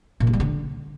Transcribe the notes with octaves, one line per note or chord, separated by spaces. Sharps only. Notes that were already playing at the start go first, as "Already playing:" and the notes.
A#2
G2
G3
D3